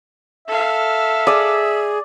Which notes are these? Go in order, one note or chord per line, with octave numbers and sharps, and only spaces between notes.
A4 E5 F5
G#4 D5 D#6